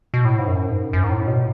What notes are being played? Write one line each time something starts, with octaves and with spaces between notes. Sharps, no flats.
B2
A2
G#2
F#2
G#2
F#2
G#2
A2
B2